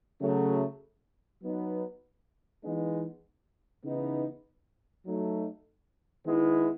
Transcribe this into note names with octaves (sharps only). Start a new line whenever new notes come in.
C#3 F#3 A3
F#3 B3 D#4
E3 G#3 B3 D#4
C#3 E3 B3 D#4
F#3 A3 D#4
D#3 G#3 B3 E4